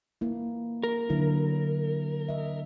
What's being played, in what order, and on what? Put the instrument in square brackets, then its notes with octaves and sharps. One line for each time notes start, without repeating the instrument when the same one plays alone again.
[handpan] A#3 E4
[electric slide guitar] A#4
[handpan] D3 F#3 E4
D#5 E5